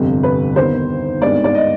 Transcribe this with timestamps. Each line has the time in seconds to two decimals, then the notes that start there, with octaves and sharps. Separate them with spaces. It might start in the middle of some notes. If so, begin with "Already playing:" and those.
Already playing: G1 F2 C3
0.23 B4
0.56 D#2 D#3 B3 C5
1.22 G#1 G2 D#3 G#3 B3 D5
1.44 D5
1.55 D#5